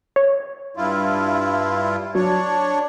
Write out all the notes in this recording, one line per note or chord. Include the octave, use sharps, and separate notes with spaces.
C#5
G2 E4 F4
F#3 D4 C#5